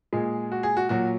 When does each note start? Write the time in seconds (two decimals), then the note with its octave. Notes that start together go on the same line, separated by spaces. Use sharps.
0.13 A#2 G#3 G#4
0.52 F#4
0.63 G#4
0.77 F#4
0.89 A#2 F#3 F#4